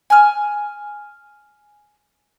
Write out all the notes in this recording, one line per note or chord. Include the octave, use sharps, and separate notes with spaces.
G#5 F6